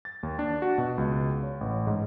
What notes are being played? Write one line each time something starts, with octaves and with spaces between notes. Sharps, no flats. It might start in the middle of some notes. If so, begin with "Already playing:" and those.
A6
D#2
D4
F#4
B2
C#2
C#5
A1
G#2